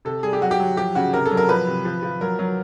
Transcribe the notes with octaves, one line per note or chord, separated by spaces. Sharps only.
C3 A4
G3 G#4
G4
F#3 F#4
G4
F#3
F3 G4
C#3 F#4
C3 A#4
A4
F#3
A#4
F3 B4
C3
F3
F3
F#3 A#4
F#3